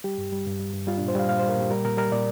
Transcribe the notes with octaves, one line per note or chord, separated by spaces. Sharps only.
G3 G4
G2
G3
G2
G3
G2
G3 F4
A#2 D4
C5
G3 F5
A#2 F5
G3 C5
A#4
A#2 G4
G3 A#4
A#2 A#4
G3 A#4
A#2 D5